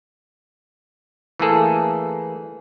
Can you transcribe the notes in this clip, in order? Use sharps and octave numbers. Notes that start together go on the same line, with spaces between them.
E3 A3 A#3 G#4 A4